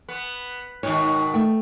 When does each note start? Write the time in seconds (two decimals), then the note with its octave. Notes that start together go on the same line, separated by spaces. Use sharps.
0.09 B3
0.83 G#2 B2 D#3 C#5
1.34 A3 G5